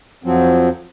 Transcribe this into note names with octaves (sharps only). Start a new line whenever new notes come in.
F2 F3 F#3 C4